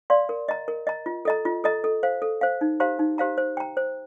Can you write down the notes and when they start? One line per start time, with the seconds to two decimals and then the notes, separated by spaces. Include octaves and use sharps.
0.10 D5 F5 C6
0.29 A#4
0.48 D#5 A#5
0.68 A#4
0.87 D#5 A#5
1.06 F4
1.25 A4 D#5 A#5
1.45 F4
1.64 A4 D#5 A#5
1.84 A4
2.03 C5 F5
2.22 A4
2.41 C5 F5
2.61 D#4
2.80 G4 C5 F5 A#5
2.99 D#4
3.18 G4 C5 F5 A#5
3.38 C5
3.57 G5 A#5
3.77 C5